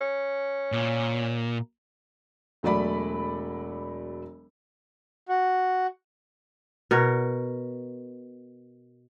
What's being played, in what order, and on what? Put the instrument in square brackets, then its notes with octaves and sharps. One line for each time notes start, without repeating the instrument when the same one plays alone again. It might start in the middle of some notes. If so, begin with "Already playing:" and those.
[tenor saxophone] C#4
[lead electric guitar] A#2
[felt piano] E1 F#3 A3 D5 B5
[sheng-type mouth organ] F#4
[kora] B2 A#4 C#5